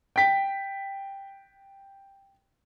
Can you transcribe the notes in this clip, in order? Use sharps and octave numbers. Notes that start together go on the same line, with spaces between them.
G5 B6